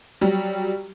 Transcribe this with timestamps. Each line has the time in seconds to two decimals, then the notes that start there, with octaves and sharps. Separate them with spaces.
0.21 F#3 G3